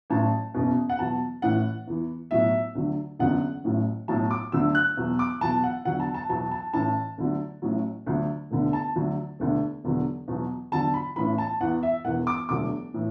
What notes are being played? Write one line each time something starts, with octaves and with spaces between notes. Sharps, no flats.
A1 A2 F#3 A5
F#1 E2 B2
F#5
E2 B2 F#3 A5
A1 A2 E3 F#5
E2 E3
B1 A2 F#3 E5
D2 D3 F#3
F#1 E2 D3 F#3 F#5
A1 A2 F#3
B1 A2 F#3 A5
D6
D2 D3 F#3 E6
F#6
E2 B2 F#3
D6
E2 B2 F#3 A5
F#5
E2 D3 F#3 F#5
A5
A5
E2 B2 F#3 A5
A5
A1 A2 E3 A5
D2 D3 F#3
A1 A2 F#3
D2 D3 F#3
E1 D2 D3
A5
D2 D3 F#3
E1 D2 D3
E1 E2 D3 F#3
E2 B2 F#3
E2 D3 F#3 A5
B5
A1 A2 E3 B5
A5
E2 E3 F#5
E5
E1 E2 E3 F#5
D6
E1 D2 D3 F#3 D6
A2 E3